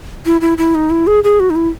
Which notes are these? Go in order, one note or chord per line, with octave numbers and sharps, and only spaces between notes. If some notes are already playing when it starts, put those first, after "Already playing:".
E4
E4
E4
D#4
E4
G#4
G#4
F#4
D#4
E4